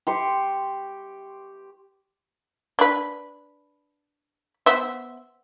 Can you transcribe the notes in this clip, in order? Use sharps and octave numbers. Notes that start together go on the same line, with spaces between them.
G4 C6 C#6
D4 B4
B3 C5 E5